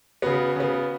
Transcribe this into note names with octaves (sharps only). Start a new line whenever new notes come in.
C#3 B3 F#4 B4
C#3 B3